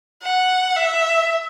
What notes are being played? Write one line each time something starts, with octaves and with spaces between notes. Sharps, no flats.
F#5
E5